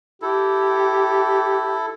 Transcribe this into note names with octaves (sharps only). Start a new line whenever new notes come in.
E4 G4 A4